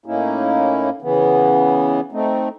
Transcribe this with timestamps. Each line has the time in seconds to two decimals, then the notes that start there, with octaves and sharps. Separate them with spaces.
0.06 A2 A#3 C#4 D#4 E4
1.02 C#3 E3 B3
2.12 A3 C4 D#4